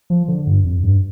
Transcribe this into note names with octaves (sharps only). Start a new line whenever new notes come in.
F3
D3
G2
F2
G2